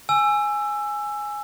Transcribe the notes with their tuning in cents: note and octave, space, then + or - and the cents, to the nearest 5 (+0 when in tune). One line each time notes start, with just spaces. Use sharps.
G#5 +0 E6 +15